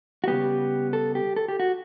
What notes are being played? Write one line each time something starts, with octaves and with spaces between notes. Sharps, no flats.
F#4
C#3 G3 B3 G4
A4
G4
A4
G4
F#4